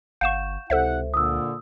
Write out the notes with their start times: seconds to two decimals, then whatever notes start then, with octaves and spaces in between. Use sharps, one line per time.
0.21 G1 F5 F#5 C#6 G6 E7
0.70 C#2 C3 E4 A4 C5 E5 F#5
1.14 A#2 D3 D#6 E6